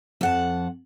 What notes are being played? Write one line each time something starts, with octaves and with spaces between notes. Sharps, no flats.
F2 F#5 A5